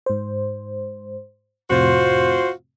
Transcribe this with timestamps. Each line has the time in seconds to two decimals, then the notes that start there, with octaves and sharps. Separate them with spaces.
0.06 G#2 C5
1.70 F2 A2 C3 F4 F#4 C5